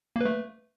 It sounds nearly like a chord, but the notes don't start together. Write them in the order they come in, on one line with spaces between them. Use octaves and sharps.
A#3 B4 A3